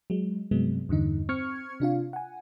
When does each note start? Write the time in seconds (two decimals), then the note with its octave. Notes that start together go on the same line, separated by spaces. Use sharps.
0.10 F#3 G#3
0.51 G2 C3 F#3 G#3 B3
0.89 E2 G2 D3 D#4
1.29 C4 C#6 F6 G#6 C#7
1.80 C3 D4 F4 F5
2.13 F#5 G#5